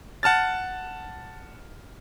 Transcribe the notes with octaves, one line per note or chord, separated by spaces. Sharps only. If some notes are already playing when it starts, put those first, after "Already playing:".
F#5 A5 F6 A6